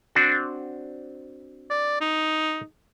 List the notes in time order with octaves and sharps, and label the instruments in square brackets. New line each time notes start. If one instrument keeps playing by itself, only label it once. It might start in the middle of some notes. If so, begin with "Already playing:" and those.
[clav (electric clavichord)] C4 D4 F#4
[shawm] D5
D#4